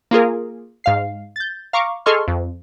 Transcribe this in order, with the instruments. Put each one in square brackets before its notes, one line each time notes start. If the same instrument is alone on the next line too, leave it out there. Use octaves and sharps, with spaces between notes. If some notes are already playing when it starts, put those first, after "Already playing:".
[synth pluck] A#3 F4 G#4 A#4
G#2 F5 C7
G6 A6
F5 A#5 C#6 D6
G#4 A4 D#5 C6 C#6 F6
F2